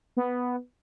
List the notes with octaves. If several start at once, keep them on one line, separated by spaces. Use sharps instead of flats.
B3